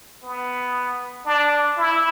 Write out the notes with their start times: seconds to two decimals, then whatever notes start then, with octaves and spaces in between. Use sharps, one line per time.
0.23 B3
1.26 D4
1.78 E4